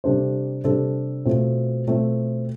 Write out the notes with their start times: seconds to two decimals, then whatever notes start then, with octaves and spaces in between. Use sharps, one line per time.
0.04 C3 G3 D4 A4 C5
0.64 C3 G3 D4 A4 C5
1.26 B2 A3 C4 F4
1.87 B2 A3 C4 F4